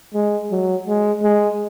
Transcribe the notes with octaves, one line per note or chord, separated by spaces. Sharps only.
G#3
F#3
G#3
G#3